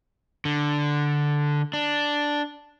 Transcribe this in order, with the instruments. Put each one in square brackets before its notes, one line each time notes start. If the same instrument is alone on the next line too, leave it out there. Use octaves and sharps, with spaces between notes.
[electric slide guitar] D3
D4